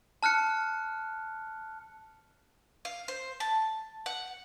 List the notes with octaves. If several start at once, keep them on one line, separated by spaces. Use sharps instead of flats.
A5 F6 F#6 C#7
F5
C5
A5
F#5